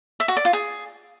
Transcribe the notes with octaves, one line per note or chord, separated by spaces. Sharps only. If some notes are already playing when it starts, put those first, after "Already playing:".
E5
F#4
D5
F4
G#4